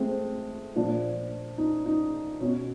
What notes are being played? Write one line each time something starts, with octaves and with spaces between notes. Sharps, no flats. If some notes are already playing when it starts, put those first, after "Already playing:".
Already playing: G#3 A3 C4
A#2 F3 D4
D#4
D#4
B2 C#4